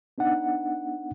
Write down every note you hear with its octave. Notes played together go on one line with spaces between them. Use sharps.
B3 D4 D#4 F#5